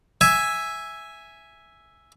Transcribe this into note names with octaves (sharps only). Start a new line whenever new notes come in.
E5 G#5